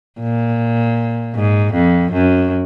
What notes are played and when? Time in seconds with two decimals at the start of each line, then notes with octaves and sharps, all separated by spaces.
0.20 A#2
1.35 G#2
1.73 F2
2.11 F#2